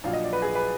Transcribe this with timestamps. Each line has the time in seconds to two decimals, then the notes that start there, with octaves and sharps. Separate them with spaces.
0.04 A#1 A#2 F#3 F5
0.13 D#5
0.24 D5
0.33 B4
0.42 G#4
0.55 B4